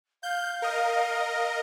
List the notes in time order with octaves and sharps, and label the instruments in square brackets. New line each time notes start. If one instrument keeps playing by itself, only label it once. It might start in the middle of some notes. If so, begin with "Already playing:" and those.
[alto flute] F5 [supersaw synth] G6
[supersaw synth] A#4 D#5